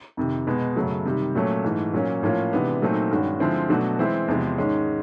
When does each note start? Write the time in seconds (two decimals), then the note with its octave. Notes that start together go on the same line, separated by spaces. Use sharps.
0.17 F2 C3 D#3
0.47 B2 G#3 B3
0.76 F#2 C#3 F#3 A3
1.05 C3 D#3 G3
1.35 A#2 F#3 A3 C#4
1.64 G#2 E3 A3
1.93 A#2 F#3 A#3 C#4
2.23 A2 F3 A#3 C#4 F4
2.52 C3 E3 G#3 B3 D4
2.82 A#2 F#3 A3 C4 D#4
3.11 G2 D#3 G#3 C#4 F#4
3.40 D3 F3 G#3 C4 E4
3.69 B2 F#3 A3 D4 F#4
3.99 E3 G#3 C4 E4
4.28 E2 C3 F3 G#3 C4
4.58 G#2 D#3 G#3 C#4